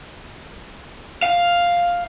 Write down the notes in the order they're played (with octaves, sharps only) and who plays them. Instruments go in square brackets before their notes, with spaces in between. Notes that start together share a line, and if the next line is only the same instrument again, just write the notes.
[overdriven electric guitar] F5